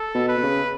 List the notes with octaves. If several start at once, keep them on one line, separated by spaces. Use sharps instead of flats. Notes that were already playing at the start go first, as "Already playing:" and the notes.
Already playing: A4
B2
B4
B2
C#3